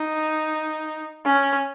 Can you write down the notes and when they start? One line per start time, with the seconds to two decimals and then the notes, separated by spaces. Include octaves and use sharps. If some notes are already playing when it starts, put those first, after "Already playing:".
Already playing: D#4
1.26 C#4